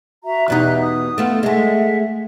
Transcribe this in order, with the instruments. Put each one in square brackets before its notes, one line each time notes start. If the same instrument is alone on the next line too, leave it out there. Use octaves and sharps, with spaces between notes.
[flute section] F#4 E5 A#5
[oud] E2 B2 D#4 [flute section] G4 E5 F#6
[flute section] D#6
[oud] A3 B3 F4
[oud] G#3 A3 [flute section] E5 F#5